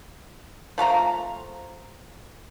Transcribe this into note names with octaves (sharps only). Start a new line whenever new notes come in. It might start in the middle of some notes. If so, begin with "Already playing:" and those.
F3 A3 F4 A#5